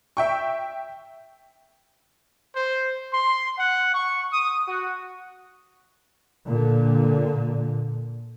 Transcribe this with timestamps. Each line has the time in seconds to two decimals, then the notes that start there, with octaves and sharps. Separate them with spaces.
0.17 E5 G5 C#6
2.55 C5
3.13 C6
3.58 F#5
3.94 C#6
4.33 D#6
4.67 F#4
6.46 A#2 D3